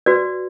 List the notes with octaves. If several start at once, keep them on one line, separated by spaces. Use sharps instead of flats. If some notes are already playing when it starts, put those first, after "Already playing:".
F#4 B4 D5